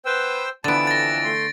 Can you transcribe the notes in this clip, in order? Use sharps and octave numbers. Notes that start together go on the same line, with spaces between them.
B3 B4 C5 G5 E6
F2 D3 E3 B3 A5 A6 D7
A6 A#6
A3 C6